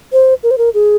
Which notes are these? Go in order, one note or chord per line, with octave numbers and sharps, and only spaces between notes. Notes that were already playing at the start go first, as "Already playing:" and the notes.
C5
A#4
C5
A#4
G#4